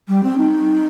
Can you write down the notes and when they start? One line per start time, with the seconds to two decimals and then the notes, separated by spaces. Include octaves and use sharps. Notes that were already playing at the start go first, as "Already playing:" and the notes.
0.08 G3
0.23 C4
0.38 D#4